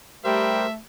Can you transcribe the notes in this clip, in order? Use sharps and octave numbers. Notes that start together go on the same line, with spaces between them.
G3 A3 G4 A#4 C5 E5